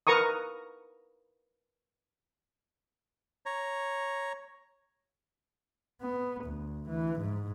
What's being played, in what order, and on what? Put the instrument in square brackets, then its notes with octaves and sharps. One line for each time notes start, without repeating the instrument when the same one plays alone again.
[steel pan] A#4 B4 A#5 C#6 D#6
[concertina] C#5 A#5
[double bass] B3
D2
E3
G#2